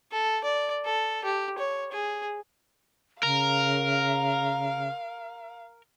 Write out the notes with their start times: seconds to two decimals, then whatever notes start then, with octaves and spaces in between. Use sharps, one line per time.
0.12 A4
0.44 D5
0.85 A4
1.24 G4
1.58 C#5
1.92 G#4
3.23 C#3 A#4 F5